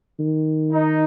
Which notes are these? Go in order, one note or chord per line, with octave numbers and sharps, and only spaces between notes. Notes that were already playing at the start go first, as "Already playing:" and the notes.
D#3
D#4